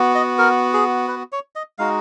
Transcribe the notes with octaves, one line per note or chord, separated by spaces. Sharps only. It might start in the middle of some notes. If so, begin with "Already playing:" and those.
Already playing: B3 F#4
D#5
A#4
G#4
B4
C#5
D#5
G#3 D#4 F#4 F5